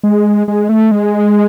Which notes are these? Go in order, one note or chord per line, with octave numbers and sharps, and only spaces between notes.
G#3
G#3
A3
G#3